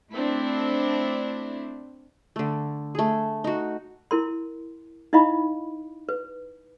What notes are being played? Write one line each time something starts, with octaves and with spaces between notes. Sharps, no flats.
A3 C4 D4 E4
D3 A3
A3 G#4
D#4 F#4
E4 A#4 C6
D#4 E4 D#5 F5 B5
B4